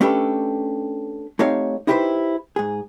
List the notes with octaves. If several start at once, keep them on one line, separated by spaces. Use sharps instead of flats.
A3 C#4 D4 G4 A4 B4
A3 C4 D#4 G4 C#5 F5
D#4 E4 G4 A4 B4 C5
G#2 G#4